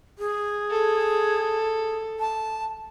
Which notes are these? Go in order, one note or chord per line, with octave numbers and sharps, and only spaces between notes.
G#4
A4
A5